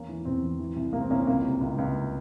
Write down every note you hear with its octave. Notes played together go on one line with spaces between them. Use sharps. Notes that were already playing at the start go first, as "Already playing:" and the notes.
Already playing: E2 A#3 C#4
E3
E2 C4
E3
E3
C2
C3 A#3
C4
C2 A#3 C#4
C4
C#2 A#3
C3
C#2
C#2